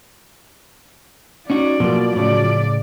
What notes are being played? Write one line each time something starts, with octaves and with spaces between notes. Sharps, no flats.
C#4 D#4 F#4 D5
B2 F3 F#3 A#3
A2 C#3 D5